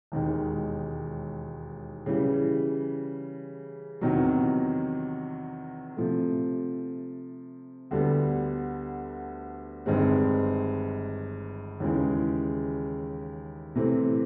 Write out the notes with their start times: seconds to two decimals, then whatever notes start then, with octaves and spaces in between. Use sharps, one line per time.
0.12 E1 D#2 D#3 G#3
2.06 C#3 E3 G3
4.01 E2 C3 D#3 F#3
5.96 C3 F3 A3
7.91 D2 D3 G3 B3
9.86 G1 G2 D#3 G#3 C4
11.80 D#2 C#3 E3 G#3
13.75 C3 E3 A3 C4